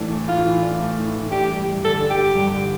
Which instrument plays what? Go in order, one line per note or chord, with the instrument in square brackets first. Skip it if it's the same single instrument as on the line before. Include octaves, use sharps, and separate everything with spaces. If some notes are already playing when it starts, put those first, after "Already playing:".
Already playing: [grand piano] A2 E3 A3 D4
A3
[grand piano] A2 [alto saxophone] F4
[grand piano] E3
D4
A3
A2
E3
[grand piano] D4 [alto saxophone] G4
[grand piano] G3
G2
[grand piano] D3 [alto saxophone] A4
[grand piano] D4
[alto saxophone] G4
[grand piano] G3
G2
D3